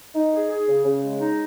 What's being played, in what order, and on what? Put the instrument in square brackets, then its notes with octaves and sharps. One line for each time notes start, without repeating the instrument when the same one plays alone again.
[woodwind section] D#4
G#4
G#4
C#3
C#3
G#3
D#4